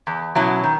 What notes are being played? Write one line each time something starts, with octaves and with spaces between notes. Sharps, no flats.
E2
B2 F#3 C#4 E4
D#3